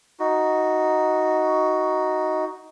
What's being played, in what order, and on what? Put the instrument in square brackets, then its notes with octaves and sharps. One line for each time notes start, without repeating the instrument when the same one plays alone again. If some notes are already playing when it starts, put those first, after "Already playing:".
[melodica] D#4 F#4